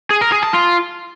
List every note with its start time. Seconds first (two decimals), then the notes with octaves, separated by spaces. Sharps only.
0.10 G#4
0.21 A#4
0.32 G#4
0.43 A5
0.53 F4